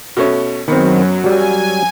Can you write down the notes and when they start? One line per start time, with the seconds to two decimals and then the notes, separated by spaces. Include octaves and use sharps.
0.17 B2 A3 C#4
0.68 F#2 D#3 F#3 B3 C4
1.24 F#3 G3 G#5